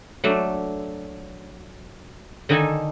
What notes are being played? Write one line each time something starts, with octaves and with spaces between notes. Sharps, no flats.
F#3 A3 D4
D3 D#3 D#4 A4 G#5 A5